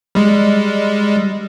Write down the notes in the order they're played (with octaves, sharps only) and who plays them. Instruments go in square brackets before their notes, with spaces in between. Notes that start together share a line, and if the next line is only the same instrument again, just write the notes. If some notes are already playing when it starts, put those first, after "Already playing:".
[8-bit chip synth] G3 G#3